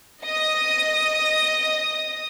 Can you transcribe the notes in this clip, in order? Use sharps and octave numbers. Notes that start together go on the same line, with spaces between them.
D#5 D#6